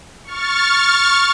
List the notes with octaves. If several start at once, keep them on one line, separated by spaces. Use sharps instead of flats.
C#6 F6 A6